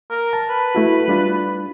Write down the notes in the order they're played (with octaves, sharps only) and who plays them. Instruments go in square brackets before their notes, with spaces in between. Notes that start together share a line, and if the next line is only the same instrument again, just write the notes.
[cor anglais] A#4
[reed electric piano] A5
[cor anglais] B4
[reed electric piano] A3 E4 F#4
G3 D4 F4